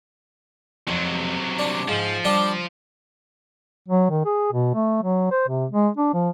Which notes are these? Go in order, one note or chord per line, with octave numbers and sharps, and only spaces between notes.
F2 C3 F#3
D4
G#2 F3
G3 D4 G4
F#3
D#3
G#4
B2
A3
F#3
C5
C3
G#3
D4
F3